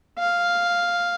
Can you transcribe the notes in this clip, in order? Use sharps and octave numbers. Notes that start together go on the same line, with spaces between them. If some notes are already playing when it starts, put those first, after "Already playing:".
F5